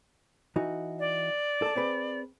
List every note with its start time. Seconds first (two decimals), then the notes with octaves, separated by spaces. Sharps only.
0.56 E3 D#4 F#4
0.99 D5
1.62 A4 A5
1.76 C4 G#4 B4